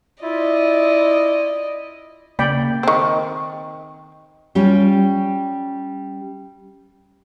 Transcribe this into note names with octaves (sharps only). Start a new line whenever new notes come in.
E4 F4 D5 D#5
C#3 A#3 D5 G5 B5
D#3 C4
G3 C#4 F4 G4